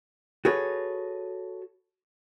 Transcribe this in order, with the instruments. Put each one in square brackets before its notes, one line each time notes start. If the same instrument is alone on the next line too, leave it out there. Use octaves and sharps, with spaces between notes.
[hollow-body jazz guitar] F#4 G#4 A4 B4 C#5